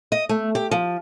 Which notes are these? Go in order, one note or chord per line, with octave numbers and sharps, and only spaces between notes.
D#5
A3
G4
F3